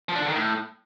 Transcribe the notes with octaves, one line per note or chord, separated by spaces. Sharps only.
F3
D4
D3
D#3
A2